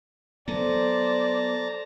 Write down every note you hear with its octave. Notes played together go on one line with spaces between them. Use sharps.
F#3 B3 A4 C5 D5 A5 A#5